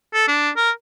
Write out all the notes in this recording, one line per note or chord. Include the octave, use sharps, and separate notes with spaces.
A4
D4
A#4